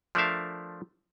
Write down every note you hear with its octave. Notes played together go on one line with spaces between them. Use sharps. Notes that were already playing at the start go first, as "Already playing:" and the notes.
F3 A3 D4 A#4 E5 F5